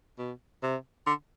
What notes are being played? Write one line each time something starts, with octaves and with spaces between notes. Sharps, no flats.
B2
C3
D3